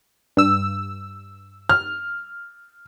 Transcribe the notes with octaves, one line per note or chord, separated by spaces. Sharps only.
G2 E6
F6